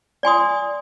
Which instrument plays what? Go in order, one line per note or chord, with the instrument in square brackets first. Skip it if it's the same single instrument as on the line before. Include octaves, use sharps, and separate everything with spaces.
[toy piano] D5 G#5 C6 D#6